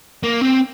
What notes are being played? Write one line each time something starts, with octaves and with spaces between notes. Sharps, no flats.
A#3
C4